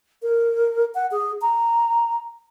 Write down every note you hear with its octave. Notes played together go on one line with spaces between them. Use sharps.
A#4
F#5
G#4
A#5